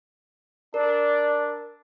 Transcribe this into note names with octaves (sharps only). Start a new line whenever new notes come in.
D4 A#4 D5